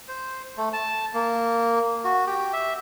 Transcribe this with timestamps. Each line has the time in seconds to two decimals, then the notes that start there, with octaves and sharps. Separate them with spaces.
0.08 C5
0.57 A3
0.73 A5
1.14 A#3
2.05 F#4
2.27 G4
2.53 E5